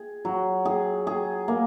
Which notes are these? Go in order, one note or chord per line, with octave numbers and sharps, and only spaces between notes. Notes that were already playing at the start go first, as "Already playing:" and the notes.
Already playing: G#4
F#3
G#4
G#4
A#3